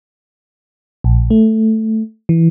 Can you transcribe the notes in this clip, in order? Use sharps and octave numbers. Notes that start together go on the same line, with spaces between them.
A#1
A3
E3